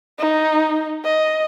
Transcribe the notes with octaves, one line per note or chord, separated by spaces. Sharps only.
D#4
D#5